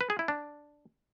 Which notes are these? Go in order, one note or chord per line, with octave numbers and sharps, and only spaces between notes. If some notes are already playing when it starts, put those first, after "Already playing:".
B4
G#4
E4
D4